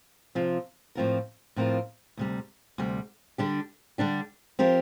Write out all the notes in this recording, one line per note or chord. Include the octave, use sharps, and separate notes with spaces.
C3 F3 C4 F4
A2 F3 C4 F4 A#4
A2 F3 C4 F4 A#4
D2 C3 G3
D2 C3 G3
D3 G3 D4 G4
D3 G3 D4 G4
F3 C4 G4 A#4